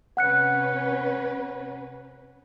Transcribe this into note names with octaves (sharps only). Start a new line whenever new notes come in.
C3 C#4 B4 F#5 F#6 C#7